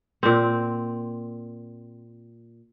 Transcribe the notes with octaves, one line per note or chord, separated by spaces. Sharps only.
A#2 C4